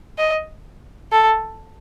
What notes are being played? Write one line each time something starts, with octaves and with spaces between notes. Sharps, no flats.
D#5
A4